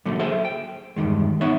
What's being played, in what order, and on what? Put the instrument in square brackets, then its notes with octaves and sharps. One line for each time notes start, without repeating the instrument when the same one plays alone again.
[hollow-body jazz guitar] D3 F#3 A3 A#3
G#4 A4 C5 E5
G5
E2 G2 A#2 D#3 G#3
B3 D#4 C#5 E5